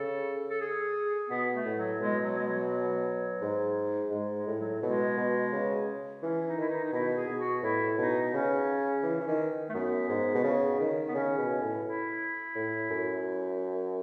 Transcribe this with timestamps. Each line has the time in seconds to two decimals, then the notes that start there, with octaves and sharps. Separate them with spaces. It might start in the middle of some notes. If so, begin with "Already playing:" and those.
Already playing: C#3 A4
0.50 A4
0.61 G#4
1.30 B2 B3
1.54 A3
1.65 A2
1.77 F#3
2.00 B2 G#3
2.24 F#3
2.38 G#3
2.47 F#3
3.41 G#2
4.11 G#2 G#3
4.35 G#3
4.47 A2
4.58 F#3
4.82 B2 G#3
5.18 B2
5.52 C#3
6.22 E3 C#4
6.46 D#4
6.58 D#3 E4
6.69 D#4
6.84 D#4
6.93 B2 E4
7.16 G#4
7.28 B2
7.39 F#4
7.63 A2 E4
7.98 B2 D#4
8.33 C#3 C#4
9.03 E3
9.20 E3
9.27 D#3
9.69 A3
9.74 F#2 B3
10.09 G#2
10.35 B2
10.44 C#3
10.80 D#3
11.08 B3
11.14 C#3 C#4
11.38 B2
11.61 A2
11.84 E4
12.55 A2
12.90 F#2